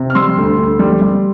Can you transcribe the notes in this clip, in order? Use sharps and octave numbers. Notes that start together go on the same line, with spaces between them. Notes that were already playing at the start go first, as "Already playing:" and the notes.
Already playing: C3
F6
G3 C6 E6
D2
D2
G3
G3